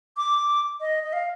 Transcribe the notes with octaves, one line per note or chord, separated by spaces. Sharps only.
D6
D#5
D#5
F5